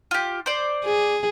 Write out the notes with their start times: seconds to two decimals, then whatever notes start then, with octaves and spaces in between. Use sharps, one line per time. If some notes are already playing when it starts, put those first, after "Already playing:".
0.11 F4 G4
0.46 C5 D5
0.85 G#4